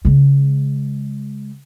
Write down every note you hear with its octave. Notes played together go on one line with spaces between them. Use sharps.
C#3 G#3